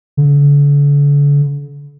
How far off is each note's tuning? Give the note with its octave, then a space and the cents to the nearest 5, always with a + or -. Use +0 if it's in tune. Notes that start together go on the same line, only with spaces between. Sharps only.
D3 -40